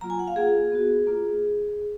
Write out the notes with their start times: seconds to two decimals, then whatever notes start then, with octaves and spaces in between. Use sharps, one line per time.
0.01 F#3 A#3 F4 A#5
0.10 G#5
0.19 F#5
0.27 F5
0.36 A#3 F4 G#4
0.72 B3 F#4
1.07 A#3 F4